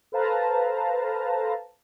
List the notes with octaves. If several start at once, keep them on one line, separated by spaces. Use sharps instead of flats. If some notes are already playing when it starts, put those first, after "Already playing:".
A4 B4 C5 F5 A5 A#5